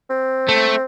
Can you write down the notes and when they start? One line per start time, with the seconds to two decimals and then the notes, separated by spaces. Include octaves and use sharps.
0.10 C4
0.48 A3